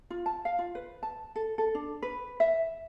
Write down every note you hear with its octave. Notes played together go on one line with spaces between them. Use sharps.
F4
A5
F5
F4
B4
A5
A4
A4
D4
B4
E5